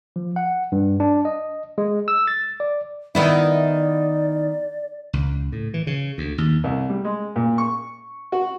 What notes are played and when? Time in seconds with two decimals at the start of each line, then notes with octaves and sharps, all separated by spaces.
0.16 F3
0.36 F#5
0.72 G2
1.00 D4
1.25 D#5
1.78 G#3
2.08 E6
2.27 A6
2.60 D5
3.15 D#3 B3 E4 D5
5.13 C#2
5.52 A2
5.74 E3
5.87 C#3
6.18 D2
6.38 D#2
6.64 C2
6.89 G3
7.05 G#3
7.36 A#2
7.58 C#6
8.32 F#4